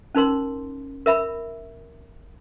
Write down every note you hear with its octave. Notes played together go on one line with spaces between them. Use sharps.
C#4 D#4 A#4 C6
A#4 E5 B5